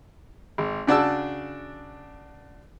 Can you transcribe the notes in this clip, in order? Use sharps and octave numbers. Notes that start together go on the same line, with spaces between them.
G#1
C#3 D4 F#4 A5 E6